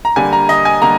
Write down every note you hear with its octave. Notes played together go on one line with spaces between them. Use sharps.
A#5
D3 G3 A#3 G#5
A#5
D#5
G#5
D3 G3 A#3 A#5